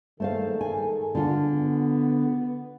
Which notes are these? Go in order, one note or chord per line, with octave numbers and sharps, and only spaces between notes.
D#3 A3 G#4 A4 C5 F5
G#5
D3 F4
B3